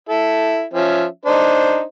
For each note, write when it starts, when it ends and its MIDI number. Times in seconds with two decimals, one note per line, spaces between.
0.09 0.64 64
0.09 0.64 69
0.74 1.05 53
0.74 1.05 61
0.74 1.05 76
1.26 1.82 62
1.26 1.82 63
1.26 1.82 72